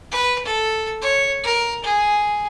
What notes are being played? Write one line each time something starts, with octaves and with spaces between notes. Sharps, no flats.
B4
A4
C#5
A#4
G#4